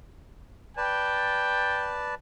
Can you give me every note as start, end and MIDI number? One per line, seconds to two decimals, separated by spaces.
0.77 2.15 71
0.77 2.15 74
0.77 2.02 79
0.77 2.15 81